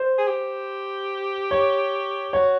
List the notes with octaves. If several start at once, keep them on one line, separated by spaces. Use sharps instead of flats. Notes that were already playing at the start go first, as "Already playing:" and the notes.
Already playing: C5
G#4
G4
C#5
F#4 C#5